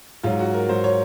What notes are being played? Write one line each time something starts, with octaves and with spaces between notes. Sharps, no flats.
G#2 F#3 F4
F#4
A#4
G#2 F#3 C5
C#5